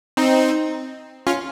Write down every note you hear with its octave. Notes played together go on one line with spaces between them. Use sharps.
C4 D#4
C#4 F4